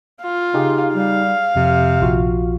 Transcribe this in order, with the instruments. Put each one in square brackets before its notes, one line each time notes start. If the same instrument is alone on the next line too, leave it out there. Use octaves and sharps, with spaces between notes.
[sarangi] F4
[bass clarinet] C#3 [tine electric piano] D#4 G4 G#4
[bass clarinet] G3 [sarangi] F5
[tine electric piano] F2 [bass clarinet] C3
[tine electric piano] A#1 F4 F#4